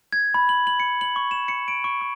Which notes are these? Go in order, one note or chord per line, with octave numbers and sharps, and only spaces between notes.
G#6
B5
F#7
F#7
C#7
F#7
C#6
E7
C#7
D7
C#6
C#6